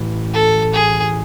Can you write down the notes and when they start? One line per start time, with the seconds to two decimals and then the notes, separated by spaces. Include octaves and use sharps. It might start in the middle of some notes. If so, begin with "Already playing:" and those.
Already playing: A1 A2 E3
0.34 A4
0.74 G#4